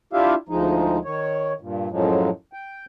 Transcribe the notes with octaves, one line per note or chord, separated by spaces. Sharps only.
D4 E4 F4 G4 E5 F5
D2 F3 G#3 D#4
D#3 C#5
G2 A#2
F#2 A2 F3 F#3 G#3
G5